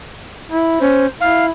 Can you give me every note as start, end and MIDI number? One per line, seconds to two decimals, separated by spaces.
0.52 0.77 64
0.81 1.06 61
0.81 1.06 72
1.21 1.50 64
1.21 1.45 77